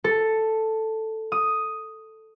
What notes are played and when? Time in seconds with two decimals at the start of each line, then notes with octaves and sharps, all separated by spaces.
0.04 A4
1.32 D#6